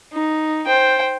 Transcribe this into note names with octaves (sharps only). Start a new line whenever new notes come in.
D#4
C5 G5